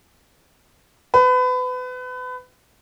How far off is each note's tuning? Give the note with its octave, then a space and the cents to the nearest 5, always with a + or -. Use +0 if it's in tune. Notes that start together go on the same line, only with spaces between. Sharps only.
B4 +30